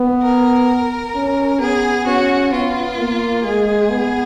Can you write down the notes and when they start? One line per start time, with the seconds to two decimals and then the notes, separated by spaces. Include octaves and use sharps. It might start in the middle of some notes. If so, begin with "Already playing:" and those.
Already playing: B3
0.23 A#4
1.15 C#4
1.61 B3 G#4
2.06 C#4 F#4
2.53 B3 F4
2.99 A#3
3.44 G#3 G#4
3.91 B3